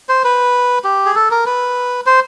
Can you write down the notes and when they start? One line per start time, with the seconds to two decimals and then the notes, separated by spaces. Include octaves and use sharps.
0.09 C5
0.24 B4
0.84 G4
1.05 G#4
1.15 A4
1.31 A#4
1.46 B4
2.06 C5